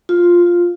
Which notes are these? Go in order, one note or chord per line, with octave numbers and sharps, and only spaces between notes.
F4